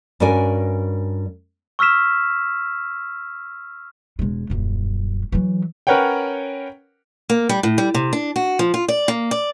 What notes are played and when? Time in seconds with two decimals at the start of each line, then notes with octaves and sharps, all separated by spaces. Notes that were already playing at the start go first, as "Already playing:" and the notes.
0.20 G2 C#4 F#4 A#4 D5 G#5
1.79 C#6 E6 F6 B6 E7
4.19 E1 G#3
4.50 D#1 F#2
5.32 E3 F#3
5.87 C#4 A#4 B4 C#5 F#5 G5
7.30 A#3
7.49 G3
7.63 A2
7.78 G3
7.94 C3
8.13 D4
8.36 F#4
8.59 F3
8.74 F4
8.88 D5
9.08 A#3
9.31 D5